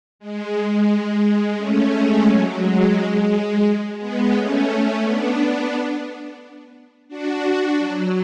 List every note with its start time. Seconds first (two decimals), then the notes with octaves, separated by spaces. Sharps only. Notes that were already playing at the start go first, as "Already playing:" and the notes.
0.19 G#3
0.53 G#3
1.23 G#3
1.57 A3 C#4
1.92 G#3
2.26 F#3
2.61 G#3
3.30 G#3
3.99 G#3 B3
4.33 A3 C#4
5.02 B3 D4
7.09 D4 F#4
7.78 F#3